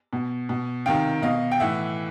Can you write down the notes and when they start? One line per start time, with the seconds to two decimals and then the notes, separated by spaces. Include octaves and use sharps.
0.13 B2
0.49 B2
0.86 C3 D#3 F5 G5
1.22 B2 D#5 F5
1.52 G5
1.60 A2 E3 E5 F#5